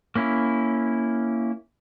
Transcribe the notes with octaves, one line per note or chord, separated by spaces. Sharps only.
A#3 C#4 E4